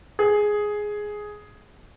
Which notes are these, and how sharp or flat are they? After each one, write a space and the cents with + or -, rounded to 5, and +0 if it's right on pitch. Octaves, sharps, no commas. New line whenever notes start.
G#4 +5